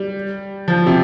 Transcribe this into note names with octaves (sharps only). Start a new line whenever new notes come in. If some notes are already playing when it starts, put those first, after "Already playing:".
Already playing: G3
F3
C3